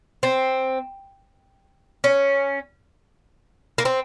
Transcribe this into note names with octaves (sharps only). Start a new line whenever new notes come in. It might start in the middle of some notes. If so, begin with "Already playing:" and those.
C4
C#4
A#3
C4